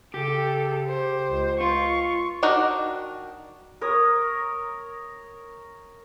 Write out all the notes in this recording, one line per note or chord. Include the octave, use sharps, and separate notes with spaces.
C#3 G4 A4
C5
C#2
F4 C#6
D#3 D4 D#4 F#4 A#4
A#4 C#5 D#6